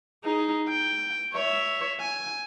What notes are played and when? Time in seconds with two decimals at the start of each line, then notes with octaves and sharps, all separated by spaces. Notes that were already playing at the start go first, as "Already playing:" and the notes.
0.24 D#4 G#4
0.69 G5
1.33 C#5 E5
2.00 G#5